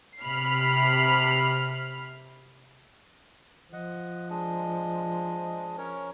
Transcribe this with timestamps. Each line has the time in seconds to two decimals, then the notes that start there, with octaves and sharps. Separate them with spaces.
0.22 C3 B5 F6 C7
3.73 F3 D#5 F#5
4.30 G#3 D4 D#5
5.78 C#4 A#4 C#5